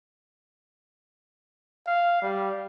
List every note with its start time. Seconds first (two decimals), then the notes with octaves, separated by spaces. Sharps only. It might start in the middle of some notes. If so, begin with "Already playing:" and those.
1.87 F5
2.22 G3